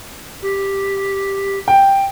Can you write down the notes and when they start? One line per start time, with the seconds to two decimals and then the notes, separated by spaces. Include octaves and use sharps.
0.42 G4
1.68 G5